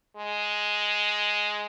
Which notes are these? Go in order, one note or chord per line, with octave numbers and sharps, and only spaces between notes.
G#3